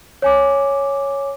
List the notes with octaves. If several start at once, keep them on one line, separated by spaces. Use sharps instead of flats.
C#5 G#5 D6